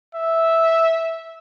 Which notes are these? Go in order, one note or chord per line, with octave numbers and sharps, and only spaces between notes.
E5